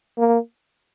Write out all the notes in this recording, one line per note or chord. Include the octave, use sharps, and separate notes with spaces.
A#3